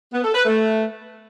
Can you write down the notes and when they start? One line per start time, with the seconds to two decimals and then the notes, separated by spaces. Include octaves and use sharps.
0.13 B3
0.24 A4
0.35 B4
0.46 A3